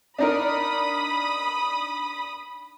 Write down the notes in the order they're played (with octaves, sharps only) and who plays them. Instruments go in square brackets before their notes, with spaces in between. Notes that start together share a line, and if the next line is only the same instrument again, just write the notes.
[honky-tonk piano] D4 D#4 A#4 [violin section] B5 D#6